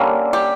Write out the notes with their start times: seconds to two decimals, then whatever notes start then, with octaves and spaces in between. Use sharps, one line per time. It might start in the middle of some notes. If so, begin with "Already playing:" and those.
Already playing: D3 G3 A#3 C#4
0.33 G4